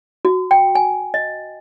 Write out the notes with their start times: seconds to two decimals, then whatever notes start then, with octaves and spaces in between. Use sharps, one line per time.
0.25 F#4
0.51 G5
0.75 G#5
1.14 D#5